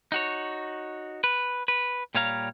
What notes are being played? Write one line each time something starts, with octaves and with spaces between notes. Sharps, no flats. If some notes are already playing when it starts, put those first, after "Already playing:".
D#4 F#4 C#5
B4
B4
A#2 G3 C#5 F5 A#5